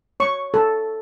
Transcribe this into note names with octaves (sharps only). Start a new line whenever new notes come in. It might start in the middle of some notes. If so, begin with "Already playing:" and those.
C#5 C#6
A4